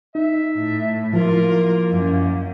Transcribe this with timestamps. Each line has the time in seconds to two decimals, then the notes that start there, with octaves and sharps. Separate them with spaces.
0.15 D#4 E5
0.56 A2
1.14 F3 F#3 A#3 E4 F4 A#4
1.90 F#2